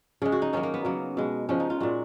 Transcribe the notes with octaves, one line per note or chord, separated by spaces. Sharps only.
C#3 G#3 G#4
F#4
D#4
D#3 F#3 A#3 C#4
A#3
B3
C#3 F#3 A#3
B2 G#3
C#3 F3 G#3 C#4
D#4
F4
A#2 G#3 F#4